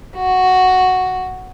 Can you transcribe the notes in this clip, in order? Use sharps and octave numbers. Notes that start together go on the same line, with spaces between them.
F#4